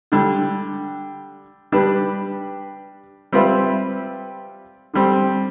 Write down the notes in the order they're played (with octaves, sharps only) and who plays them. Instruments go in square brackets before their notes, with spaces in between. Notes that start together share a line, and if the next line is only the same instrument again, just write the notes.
[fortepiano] D3 G3 D4
G3 D4 G4 B4
G3 C4 F4 B4 E5
D3 G3 C4